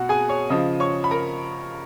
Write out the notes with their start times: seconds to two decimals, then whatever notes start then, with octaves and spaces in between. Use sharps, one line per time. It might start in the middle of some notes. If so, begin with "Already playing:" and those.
Already playing: B2 F#4 F#5
0.09 G#4 G#5
0.29 C#5 C#6
0.50 C#3 F3 D#5 D#6
0.80 C#5 C#6
1.04 B5
1.11 A#4 A#5